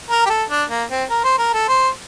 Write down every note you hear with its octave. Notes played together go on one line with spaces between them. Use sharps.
A#4
G4
A4
D4
A#3
C4
A#4
C5
A#4
A4
C5